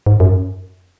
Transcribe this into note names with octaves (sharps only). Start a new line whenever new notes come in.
G#2
F#2